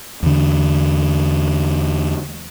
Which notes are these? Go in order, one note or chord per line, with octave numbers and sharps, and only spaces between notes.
E2 D3